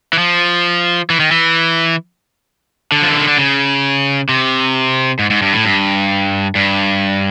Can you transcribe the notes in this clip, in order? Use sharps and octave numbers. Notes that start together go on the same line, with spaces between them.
E3
F3
E3
D#3
E3
D3
F3
E3
D#3
D3
C#3
C3
G#2
G#2
G2
A2
G2
G2